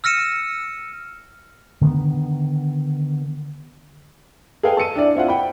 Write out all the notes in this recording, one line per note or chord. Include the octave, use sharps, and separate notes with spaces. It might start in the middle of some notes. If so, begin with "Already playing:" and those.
E6 F6 A#6 C#7 D#7 E7
D3 D#3 G#3 B3
G#4 A4 B4 F5 G5 G#5
A5 E6 C#7 D#7
D4 E4 D5
C4 E4 F4 F#5
G5 B5